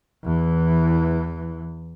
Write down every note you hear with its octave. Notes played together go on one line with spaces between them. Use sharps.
E2 E3